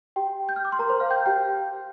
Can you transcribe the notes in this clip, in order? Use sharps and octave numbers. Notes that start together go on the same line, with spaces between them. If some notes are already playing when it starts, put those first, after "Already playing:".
G4 G5
G6
F6
D6
C6
A#4 A#5
C5 C6
F5 F6
G5 G6
G4 G5